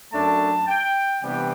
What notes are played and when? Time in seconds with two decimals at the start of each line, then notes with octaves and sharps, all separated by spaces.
0.13 F#2 F#3 A3 D4 A5
0.68 G5
1.21 C3 E3 G3 B3 D4 G5